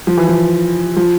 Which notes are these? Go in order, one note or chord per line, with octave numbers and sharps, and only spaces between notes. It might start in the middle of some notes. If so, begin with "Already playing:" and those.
F3
E3
F3
F3